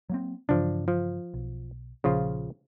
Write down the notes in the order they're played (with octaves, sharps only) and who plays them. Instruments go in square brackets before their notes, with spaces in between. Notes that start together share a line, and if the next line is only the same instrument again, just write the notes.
[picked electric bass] F#3 A#3 C4
[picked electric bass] G2 C#3 E3 [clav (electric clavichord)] F3 D4
[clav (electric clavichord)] F3
[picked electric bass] B1
[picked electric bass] A#1 [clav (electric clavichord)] C#3 F3 F4